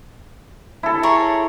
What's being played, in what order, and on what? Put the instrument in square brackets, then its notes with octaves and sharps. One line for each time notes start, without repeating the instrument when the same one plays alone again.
[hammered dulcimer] E4 A4
[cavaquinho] G#4 A#4 C#5